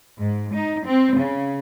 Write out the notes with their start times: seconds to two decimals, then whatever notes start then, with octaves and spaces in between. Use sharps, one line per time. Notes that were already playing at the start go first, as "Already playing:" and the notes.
0.18 G#2
0.53 D#4
0.85 C4
1.17 C#3